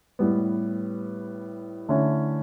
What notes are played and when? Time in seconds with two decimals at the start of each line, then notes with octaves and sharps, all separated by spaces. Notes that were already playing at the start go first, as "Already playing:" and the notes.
0.19 A2 G3 B3
1.89 D3 A3 C#4 E4